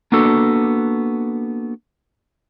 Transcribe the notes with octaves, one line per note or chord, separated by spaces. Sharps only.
A#3 B3 D4 F#4 A4